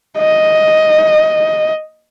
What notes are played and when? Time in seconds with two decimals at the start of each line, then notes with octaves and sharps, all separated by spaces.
0.18 D#5